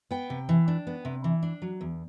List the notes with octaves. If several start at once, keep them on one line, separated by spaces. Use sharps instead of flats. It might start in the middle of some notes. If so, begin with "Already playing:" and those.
B3 G5
C3
E3
D4
B3
C3
E3
D4
F#3
E2